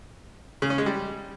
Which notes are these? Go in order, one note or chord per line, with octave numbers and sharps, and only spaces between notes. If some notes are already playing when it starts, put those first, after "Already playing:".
C#3
C#4
G#3
G3